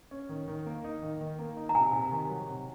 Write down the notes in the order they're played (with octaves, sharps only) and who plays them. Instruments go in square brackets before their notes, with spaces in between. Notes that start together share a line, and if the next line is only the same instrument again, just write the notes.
[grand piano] C#4
D#3
D#3
A#3
D#4
D#3
D#3
A#3
D#4
[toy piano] A#5
[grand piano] C3 [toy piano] G#5
[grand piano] C3
D#3
F#3
C3